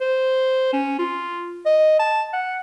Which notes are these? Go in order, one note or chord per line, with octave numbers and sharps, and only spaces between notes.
C5
C#4
F4
D#5
A5
F#5